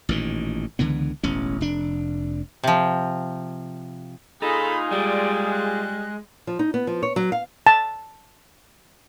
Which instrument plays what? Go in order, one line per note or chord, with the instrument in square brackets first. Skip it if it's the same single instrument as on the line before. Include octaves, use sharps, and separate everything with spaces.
[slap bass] A1 A#2 D#3
C#2 D3 E3 B3
E1 A1 C#4
F1 D4
[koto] C3 F3
[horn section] A#2 F4 G#4 [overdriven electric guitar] D#4 [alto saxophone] A4 [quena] B5
[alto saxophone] G3 [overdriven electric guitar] G#3 [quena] D5
[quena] F#6
[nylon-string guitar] F3
D#4
B3
F3
C#5
F#3
F5
[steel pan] A5